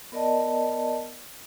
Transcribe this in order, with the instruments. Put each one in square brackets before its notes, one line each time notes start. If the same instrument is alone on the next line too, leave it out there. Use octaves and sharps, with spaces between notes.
[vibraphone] B3 A#4 D5 D#5 A5